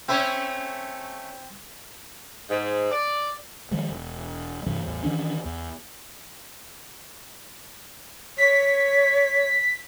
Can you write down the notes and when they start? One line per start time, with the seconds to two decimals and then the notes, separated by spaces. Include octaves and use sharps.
0.09 A3 C4 C#4 E4 C#5
2.50 G#2
2.91 D5
3.71 D#3 F3 G#3
3.90 E1
4.66 G2 C3 E3
4.83 A1 E2
5.03 D#3 E3 C#4 D4
5.45 E2
8.38 C#5 B6